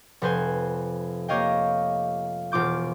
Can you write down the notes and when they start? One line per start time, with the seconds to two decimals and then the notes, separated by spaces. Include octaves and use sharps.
0.22 F1 B4 C5 G#5
1.28 A#3 G4 C#5 D#5 F5 G5
2.52 E1 F4 D6 G6